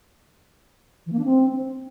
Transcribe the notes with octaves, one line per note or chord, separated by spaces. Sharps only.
E3
A#3
D4
C4